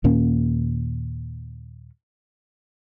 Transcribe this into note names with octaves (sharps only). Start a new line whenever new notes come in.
D#2 A#2 A#3 C#4